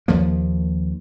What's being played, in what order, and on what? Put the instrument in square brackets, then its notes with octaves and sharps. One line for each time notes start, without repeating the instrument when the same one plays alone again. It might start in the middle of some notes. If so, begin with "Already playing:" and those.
[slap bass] D#2 F3 A#3